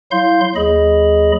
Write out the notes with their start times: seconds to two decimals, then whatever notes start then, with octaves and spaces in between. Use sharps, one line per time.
0.11 F#3 E4 F5 C6 G6
0.56 D#2 F#3 G#4 D#5 B5